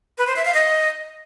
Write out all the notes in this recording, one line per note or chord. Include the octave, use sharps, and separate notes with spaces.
B4
C5
E5
F5
D#5